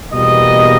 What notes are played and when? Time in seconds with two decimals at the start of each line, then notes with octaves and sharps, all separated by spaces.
0.12 E2 B2 G3 A#3 D#5